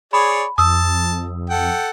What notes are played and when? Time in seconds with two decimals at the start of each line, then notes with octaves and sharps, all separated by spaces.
0.13 G#4 C#5 D5 B5
0.58 F2 A5 D#6 E6
1.50 A4 F#5 G5